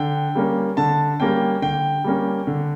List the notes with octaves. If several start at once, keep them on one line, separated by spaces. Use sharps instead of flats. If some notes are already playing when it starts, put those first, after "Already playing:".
Already playing: D3 G5
G3 A#3 C#4
D3 A5
G3 A#3 C#4 G5
D3 G5
G3 A#3 C#4
D3